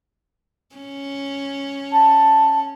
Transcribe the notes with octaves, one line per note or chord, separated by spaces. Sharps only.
C#4
A5